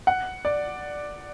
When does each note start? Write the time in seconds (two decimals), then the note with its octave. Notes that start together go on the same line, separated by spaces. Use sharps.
0.07 F#5
0.45 D5